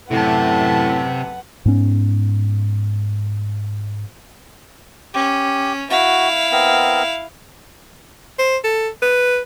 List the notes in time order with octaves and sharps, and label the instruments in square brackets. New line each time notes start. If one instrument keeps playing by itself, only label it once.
[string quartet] F#2 A3 A5 [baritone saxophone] A2 [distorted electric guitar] C3 [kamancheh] B4 F#5
[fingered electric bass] G#2 B3 C#4
[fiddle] C#4 [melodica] G4
[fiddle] E4 F5 [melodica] F#4
[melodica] B3 C4 A#4
[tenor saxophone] C5
A4
B4